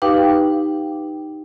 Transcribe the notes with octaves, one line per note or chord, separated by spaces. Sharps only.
D#4 G4 B4 F5 G5 D6